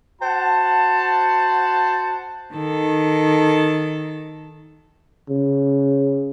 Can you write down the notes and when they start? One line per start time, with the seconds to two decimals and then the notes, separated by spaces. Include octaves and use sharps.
0.21 F#4 C5 F#5 A5
2.53 D#3 A4
5.30 C#3